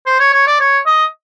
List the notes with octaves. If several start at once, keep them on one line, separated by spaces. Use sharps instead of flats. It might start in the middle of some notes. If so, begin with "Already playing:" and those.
C5
C#5
C#5
D5
C#5
D#5